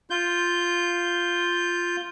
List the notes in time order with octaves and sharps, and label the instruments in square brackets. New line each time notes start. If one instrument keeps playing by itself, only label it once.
[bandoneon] F4 G6